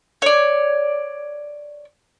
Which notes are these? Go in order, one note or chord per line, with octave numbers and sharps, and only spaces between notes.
C#5 D5